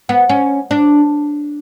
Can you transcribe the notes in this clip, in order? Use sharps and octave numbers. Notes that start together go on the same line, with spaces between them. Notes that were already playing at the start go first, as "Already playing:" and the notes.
B3
C#4
D4